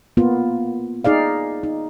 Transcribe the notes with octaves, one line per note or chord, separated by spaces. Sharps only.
A#3 B3 F4
D#4 G#4 D5 F5
D#4